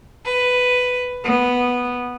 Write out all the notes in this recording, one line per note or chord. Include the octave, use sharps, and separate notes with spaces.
B4
B3